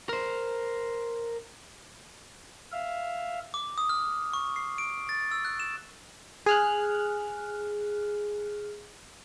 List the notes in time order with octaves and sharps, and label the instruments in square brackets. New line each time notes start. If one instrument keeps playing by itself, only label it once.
[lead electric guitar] A#4 C5
[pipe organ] E5 F5
[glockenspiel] D6
D#6
F6
C#6
C7
D7
A6
E6
F#6
E7
[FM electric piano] G#4 F6 F#6